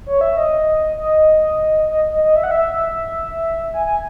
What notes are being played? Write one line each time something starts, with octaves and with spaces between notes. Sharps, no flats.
C#5
E5
D#5
D#5
D#5
D#5
D#5
E5
F#5
E5
G#5
G#5